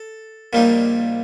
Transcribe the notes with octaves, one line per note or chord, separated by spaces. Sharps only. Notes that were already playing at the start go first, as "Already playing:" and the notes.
Already playing: A4
A#1 A#2 G3 A#3 D#4